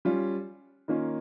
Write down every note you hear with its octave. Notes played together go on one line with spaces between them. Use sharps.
G3 C#4 F4
D#3 A#3 C#4 F4